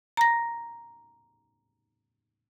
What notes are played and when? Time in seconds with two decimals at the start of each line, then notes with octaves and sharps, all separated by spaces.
0.17 A#5 A#6